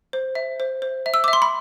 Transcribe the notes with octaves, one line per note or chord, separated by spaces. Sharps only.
C5
E5
C5
C5
E5
E6
E5 D6
C6
B5